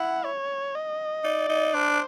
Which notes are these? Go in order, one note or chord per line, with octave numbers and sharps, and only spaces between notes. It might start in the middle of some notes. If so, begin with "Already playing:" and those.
Already playing: E4 F#5
C#5
D#5
D#4 D5
D#4
D4 C5